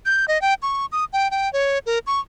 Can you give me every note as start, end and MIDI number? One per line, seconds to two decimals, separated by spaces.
0.06 0.25 91
0.28 0.41 75
0.42 0.54 79
0.62 0.86 85
0.92 1.05 87
1.13 1.30 79
1.31 1.51 79
1.53 1.79 73
1.86 1.99 70
2.07 2.20 85